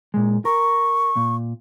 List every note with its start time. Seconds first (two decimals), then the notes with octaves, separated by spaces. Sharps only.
0.14 A#2 G#3
0.45 A#4 C#6
1.16 A#2